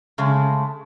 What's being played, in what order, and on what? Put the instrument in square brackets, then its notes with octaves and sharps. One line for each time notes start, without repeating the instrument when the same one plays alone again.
[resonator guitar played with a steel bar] C#3 G#3 A3